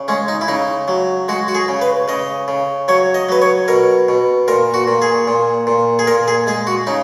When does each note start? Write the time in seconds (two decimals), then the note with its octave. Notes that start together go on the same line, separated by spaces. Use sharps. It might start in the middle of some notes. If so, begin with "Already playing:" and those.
Already playing: C#3
0.08 G#3 C#4
0.28 D#4
0.41 E4
0.48 C#3 D#4
0.88 F#3
1.28 G#3 F#4
1.48 F#4
1.55 G#4
1.68 C#3
1.81 B4
2.08 C#3 D#5
2.48 C#3
2.88 F#3 C#5
3.14 D#5
3.29 F#3 B4
3.42 C#5
3.68 B2 A#4
4.09 B2
4.48 A#2 A#4
4.74 F#4
4.88 A#2
5.02 G#4
5.28 A#2
5.67 A#2
5.99 G#4
6.07 A#2 A#4
6.28 G#4
6.47 G#3 G#4
6.67 F#4
6.87 C#3 D#4